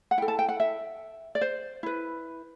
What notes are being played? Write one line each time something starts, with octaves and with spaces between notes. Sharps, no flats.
F#5
E4 A4 G5
A5
G5
F#5
E5
D5
C5
E4 B4